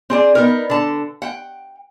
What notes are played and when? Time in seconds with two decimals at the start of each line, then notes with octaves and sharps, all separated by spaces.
0.10 C4 G#4 D5
0.35 B3 D#4 A#4
0.70 D3 A5
1.22 F#5 G5